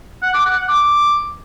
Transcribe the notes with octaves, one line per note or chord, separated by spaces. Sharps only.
F#5
D6
F#5
F#5
D6